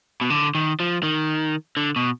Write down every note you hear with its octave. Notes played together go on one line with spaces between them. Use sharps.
B2
D3
D#3
F3
D#3
D3
B2